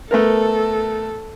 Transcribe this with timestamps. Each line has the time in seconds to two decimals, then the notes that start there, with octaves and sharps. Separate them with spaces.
0.11 A3 B3 A4 A#4